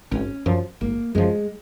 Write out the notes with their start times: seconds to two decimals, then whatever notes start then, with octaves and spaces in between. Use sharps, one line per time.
0.12 G#1 C#4
0.46 F#2 F3
0.81 G#1 A#3
1.15 F#2 F3 G#3